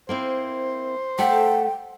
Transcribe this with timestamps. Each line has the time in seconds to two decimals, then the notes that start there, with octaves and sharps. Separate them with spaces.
0.09 A#3 C4 E4 C5
1.18 A3 A4 F#5 G5